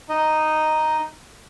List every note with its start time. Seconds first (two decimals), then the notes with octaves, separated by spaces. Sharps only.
0.09 D#4 D#5